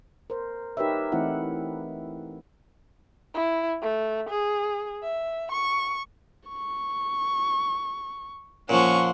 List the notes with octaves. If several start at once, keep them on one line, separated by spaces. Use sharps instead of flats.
A#4 C5
D#4 G4 A#4 B4 C#5 E5
E3 A3 C4 D#4 E4 F#5
E4
A3
G#4
E5
C#6
C#6
A#2 F3 C#4 F#5 C6 C#6